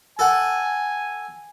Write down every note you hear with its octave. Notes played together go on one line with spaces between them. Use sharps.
A4 F#5 G#5